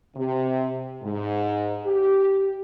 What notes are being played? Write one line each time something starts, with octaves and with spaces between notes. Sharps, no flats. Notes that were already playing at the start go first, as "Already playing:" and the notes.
C3
G#2
G4